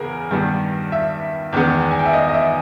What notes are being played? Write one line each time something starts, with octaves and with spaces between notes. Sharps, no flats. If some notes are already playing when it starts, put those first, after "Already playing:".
Already playing: E2 C#3 G#4 A#4
G2 D#3 G3 B3
E5
E2 D#3 G#3 B3
G#5
G5
E5
D#5
D#5
E5